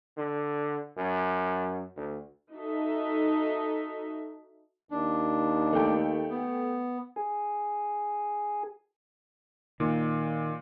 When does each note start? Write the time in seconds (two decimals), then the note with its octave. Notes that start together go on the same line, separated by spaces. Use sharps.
0.17 D3
0.97 F#2
1.96 D2
2.53 D#4 F#4 A4 E5
4.91 D#2 D4
5.73 A3 G5
6.29 B3
7.16 G#4
9.80 A#2 D#3